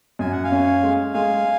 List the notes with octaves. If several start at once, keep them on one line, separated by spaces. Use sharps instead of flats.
F#2 G#5
F#5
F5 G#5
C#4
G#3
G#3 F5 G#5